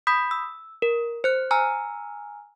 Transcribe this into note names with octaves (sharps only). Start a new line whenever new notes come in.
B5 D#6 G6 B6
E6
A#4
C5 F#6
G#5 A#5 E6 F6